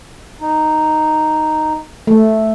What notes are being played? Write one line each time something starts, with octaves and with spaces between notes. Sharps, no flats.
D#4
A3